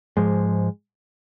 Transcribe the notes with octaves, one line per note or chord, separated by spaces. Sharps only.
G#2 F3 G#3